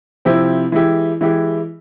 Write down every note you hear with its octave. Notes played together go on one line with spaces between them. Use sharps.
C3 F3 C4 E4 G4
E3 G#3 E4 G4
E3 G#3 E4 G4